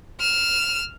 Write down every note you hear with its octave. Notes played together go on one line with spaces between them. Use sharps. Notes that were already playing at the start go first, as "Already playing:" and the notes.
F6 E7